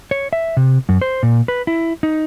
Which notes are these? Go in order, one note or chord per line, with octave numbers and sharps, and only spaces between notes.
C#5
E5
C3
F#2
C5
A#2
B4
E4
D#4